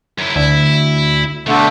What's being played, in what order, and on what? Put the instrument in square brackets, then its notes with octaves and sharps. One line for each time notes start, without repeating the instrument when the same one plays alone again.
[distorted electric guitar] F#2 E4
[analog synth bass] D2 [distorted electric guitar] E4
[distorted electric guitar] B2 G3 [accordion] D3 A3